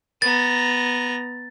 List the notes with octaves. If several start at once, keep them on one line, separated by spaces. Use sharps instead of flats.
B3 A#5 A6